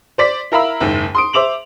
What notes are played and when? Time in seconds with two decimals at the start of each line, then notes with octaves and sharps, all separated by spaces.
0.18 C5 D5 B6
0.52 E4 A#4 F5 B5 E6
0.80 F#1 D#2 G#2
1.15 C6 D#6 D7
1.33 C5 E5 D6 F7 F#7